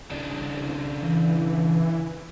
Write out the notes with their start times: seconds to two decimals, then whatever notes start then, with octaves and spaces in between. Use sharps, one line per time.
0.11 C2 C#3 D4
1.03 E3